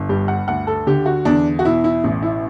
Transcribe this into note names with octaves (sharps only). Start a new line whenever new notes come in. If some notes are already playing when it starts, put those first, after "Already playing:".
Already playing: G1
G2 G4
F#5
D2 F#5
A4
D3 G4
F#4
E2 D4
F#4
B2 E4
E4
A1
E4